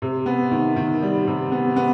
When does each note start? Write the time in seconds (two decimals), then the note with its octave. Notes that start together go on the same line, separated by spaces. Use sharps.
0.02 C3
0.26 B3
0.51 D#3
0.76 D#3
1.02 G3
1.27 C3
1.52 B3
1.76 B3